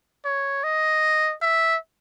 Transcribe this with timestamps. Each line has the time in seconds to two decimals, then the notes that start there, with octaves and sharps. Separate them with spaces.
0.25 C#5
0.64 D#5
1.42 E5